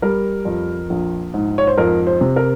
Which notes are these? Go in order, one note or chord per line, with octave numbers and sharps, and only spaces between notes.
G3 A#4
F2
A#1
G#2
C#5
C5
F2 A#4
C5
C3
A#4